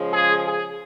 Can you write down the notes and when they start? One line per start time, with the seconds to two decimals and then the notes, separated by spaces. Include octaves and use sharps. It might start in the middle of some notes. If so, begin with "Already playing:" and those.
Already playing: C#3 F3 G#3
0.14 G#4
0.45 G#4